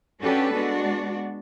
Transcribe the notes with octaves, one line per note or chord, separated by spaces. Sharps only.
C#4 D4 F#4 G4 A4 B4
G#3 B3 D4 F#4